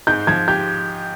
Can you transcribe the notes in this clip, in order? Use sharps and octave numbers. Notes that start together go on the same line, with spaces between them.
G#2 G6
F3 G#6
G4 G6